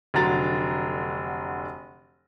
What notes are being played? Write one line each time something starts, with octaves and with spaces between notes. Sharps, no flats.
F1 D3 F#3 F#4 A#5 A6